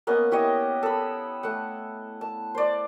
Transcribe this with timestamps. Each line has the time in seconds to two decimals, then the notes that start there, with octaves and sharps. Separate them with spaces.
0.07 A#3 B3 C#4 D#5
0.31 E4 G4 C#5 D#5
0.83 A4 B5
1.43 A3 F#5
2.21 A5
2.55 C5 D5